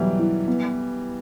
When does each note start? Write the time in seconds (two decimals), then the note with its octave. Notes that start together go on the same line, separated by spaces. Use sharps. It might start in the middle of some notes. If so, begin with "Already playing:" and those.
Already playing: B2 E3 F#3 G3 E4
0.19 E4
0.48 B3